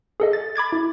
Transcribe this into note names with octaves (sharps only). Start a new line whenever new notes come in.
G#4 A4 D#5
A6
B5 D6 G#6 A6
E4